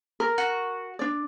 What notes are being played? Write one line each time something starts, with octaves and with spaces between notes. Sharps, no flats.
A#4
F#4
D4 D5